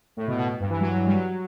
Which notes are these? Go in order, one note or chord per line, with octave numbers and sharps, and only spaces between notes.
A2
B2
B2
B2
G2
E3
F#3
F#3
G3
F#3